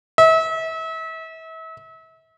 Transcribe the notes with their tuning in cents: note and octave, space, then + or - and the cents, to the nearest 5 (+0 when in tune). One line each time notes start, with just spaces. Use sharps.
E5 -35